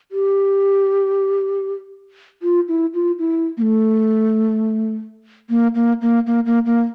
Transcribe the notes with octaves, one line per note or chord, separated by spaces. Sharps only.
G4
F4
E4
F4
E4
A#3
A3
A#3
A#3
A#3
A#3
A#3
A#3